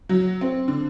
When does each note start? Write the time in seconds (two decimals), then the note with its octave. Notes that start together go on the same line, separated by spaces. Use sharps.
0.09 F#3
0.41 C4
0.68 D3